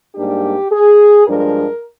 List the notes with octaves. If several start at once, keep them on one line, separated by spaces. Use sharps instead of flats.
G#2 G3 A#3 D4 G4
G#4
G2 F3 G#3 D4 A#4